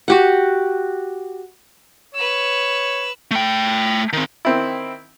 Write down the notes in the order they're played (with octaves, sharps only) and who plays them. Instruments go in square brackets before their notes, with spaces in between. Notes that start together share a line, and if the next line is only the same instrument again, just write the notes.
[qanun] F#4 G4 F#5
[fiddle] B4 E6 [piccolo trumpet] C#5
[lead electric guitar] A3 G5
D#3 C4
[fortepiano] D#3 C4 E4